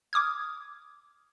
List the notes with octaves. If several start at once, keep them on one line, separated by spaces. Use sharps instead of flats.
D6 D#6 F6 G#6